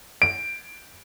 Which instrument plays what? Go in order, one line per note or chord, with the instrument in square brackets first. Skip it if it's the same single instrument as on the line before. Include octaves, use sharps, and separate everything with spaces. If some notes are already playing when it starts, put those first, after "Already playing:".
[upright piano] D7